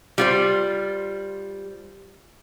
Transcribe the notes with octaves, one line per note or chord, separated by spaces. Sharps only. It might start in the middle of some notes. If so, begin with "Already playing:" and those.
G3 F4 C5